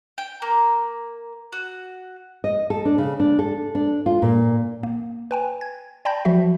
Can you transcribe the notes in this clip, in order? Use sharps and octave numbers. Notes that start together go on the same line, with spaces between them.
G5
A#3
F#4
D#5
A4
D4
C#3
D4
A4
D4
F4
A#2
A#3
B4 G5 G#5
G#6
D5 G5 A5 B5 G6 A#6
F3 F#3 F#4 E5